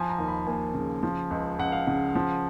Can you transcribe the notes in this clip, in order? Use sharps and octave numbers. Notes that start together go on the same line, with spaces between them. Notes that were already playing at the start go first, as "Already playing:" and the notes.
Already playing: F3 G#5
A#5
D#2
B5
A#3 G#5
C#3
F3
C#2
C#2 F#5
F5
C#3 F#5
F3